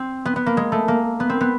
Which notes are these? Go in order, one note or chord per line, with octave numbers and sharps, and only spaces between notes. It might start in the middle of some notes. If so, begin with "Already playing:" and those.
Already playing: C4
B3
B3
A#3
G#3
A3
A#3
B3
C4
B3